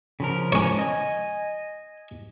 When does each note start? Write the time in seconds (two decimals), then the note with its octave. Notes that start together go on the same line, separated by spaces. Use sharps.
0.20 C#3 F3 A#4
0.52 C#4 C#5
0.79 D#5 G#5